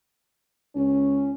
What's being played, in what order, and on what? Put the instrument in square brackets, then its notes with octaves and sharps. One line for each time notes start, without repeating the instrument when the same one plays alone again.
[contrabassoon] C#2 [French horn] C#4